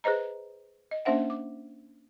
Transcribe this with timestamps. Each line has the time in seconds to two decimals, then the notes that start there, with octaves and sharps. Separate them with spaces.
0.04 G#4 B4 C5 D#5 A#5
0.91 D#5
1.05 A#3 C#4 D4 C5 E5 F#5
1.30 D6